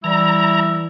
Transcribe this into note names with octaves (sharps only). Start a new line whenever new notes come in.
E3 G3 E4 A#5 E6